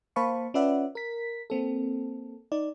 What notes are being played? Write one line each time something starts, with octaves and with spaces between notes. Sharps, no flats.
A#3 C5 F5 A5 B5 C#6
C#4 F4 B4 D5 E5 F#5
A#4 B6
A#3 C4 A4
D#4 D5